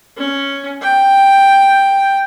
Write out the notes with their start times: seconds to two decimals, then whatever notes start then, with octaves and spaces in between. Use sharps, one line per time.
0.17 C#4
0.82 G5